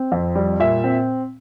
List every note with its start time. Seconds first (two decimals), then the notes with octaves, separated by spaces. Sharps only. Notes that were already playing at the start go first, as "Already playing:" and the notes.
Already playing: C4
0.12 F2
0.35 G3
0.60 A#2 E5
0.84 C4